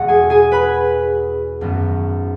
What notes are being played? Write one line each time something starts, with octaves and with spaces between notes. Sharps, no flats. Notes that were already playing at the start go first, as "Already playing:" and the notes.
Already playing: E2 B2 G#3 F#4 F#5
G#4 G#5
G#4 G#5
B4 B5
G#1 F#2 F#3 B3